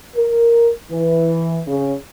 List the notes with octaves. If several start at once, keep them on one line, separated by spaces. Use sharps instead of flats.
A#4
E3
C#3